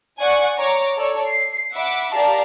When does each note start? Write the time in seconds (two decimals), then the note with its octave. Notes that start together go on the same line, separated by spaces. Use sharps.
0.20 D5 F#5 G#5 C#6
0.57 C#5 A#5 C#6 D6
0.98 A4 C#5 D5
1.28 C7
1.73 E5 F#5 B5 D6
2.13 G4 A#4 D5 F5 A5 A#5